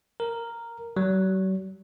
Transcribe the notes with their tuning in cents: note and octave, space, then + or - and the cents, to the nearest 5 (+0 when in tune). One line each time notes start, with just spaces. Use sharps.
A#4 -5
F#3 +45